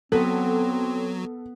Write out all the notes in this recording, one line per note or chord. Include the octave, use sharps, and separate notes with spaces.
F#3 B3 C4 A4